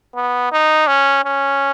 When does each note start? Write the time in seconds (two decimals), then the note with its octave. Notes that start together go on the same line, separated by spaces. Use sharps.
0.15 B3
0.52 D#4
0.87 C#4
1.25 C#4